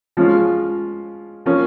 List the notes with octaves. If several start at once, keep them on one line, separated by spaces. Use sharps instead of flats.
F3 G#3 C#4 F4
F3 A#3 C#4